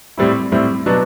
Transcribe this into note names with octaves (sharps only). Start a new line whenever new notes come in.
A2 G3 C4 E4
A2 G3 C4 E4
B2 F#3 B3 D4